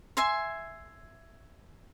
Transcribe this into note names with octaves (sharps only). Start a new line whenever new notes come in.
E5 G#5 C6